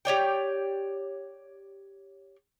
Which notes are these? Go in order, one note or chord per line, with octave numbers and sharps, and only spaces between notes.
G4 C#5 D5 G5